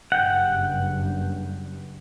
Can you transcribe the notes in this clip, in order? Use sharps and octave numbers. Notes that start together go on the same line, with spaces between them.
F#1 G2 F#5 G5